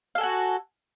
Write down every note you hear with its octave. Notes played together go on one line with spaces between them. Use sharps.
F#4 A4 F5 G#5